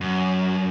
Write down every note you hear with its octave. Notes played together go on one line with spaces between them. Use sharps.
F#2